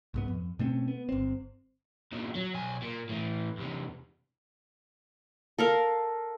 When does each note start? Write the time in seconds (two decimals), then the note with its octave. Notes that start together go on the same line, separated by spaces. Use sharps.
0.14 C2 G#2 B3
0.28 F2
0.59 B2 A3 C4 C#4
0.88 B3
1.09 G1 C4
2.12 E2 A#2
2.35 F#3
2.55 B1 G#5
2.82 A#2
3.09 A2 E3
3.57 E2 C3
5.59 A4 A#4 F5